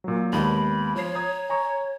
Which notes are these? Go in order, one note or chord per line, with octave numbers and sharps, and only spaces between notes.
A#2 F#3
D#2 G#3 B3 B5
F3 C#5 C7
A#5 D#6 G#6
G#5 A#5 C#6